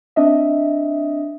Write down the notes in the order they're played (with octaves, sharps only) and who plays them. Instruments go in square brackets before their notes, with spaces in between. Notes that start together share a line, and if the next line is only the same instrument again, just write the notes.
[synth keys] C4 D4 D#5 E5